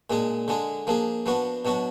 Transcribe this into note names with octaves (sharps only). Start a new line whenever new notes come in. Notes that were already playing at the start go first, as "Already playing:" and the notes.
A#2 G#3 D4 G#4
D3 G#3 D4 G#4
F3 A#3 D4 G#4
F3 B3 D4 F#4
B2 F#3 D4 F#4